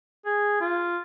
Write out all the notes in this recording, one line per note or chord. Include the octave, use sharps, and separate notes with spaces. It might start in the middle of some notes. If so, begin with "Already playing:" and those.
G#4
F4